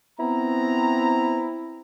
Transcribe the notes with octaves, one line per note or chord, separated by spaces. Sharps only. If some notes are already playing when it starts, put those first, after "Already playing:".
B3 C4 E4 A#5